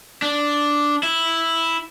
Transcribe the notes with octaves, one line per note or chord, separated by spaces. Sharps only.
D4
E4